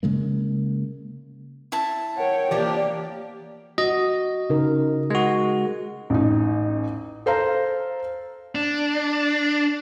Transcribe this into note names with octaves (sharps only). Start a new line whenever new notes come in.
C#3 G#3 A#3
E4 E5 A5
A#4 C#5 F#5 G5
E3 F3 A#3 D4 G4
F#4 D#5
C#3 D#4 A#4
G#3 F#4
A1 D#4
A4 C5 F5 A#5
D4